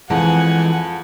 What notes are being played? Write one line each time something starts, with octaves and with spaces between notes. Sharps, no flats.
F2 E3 G#3 F#5 G#5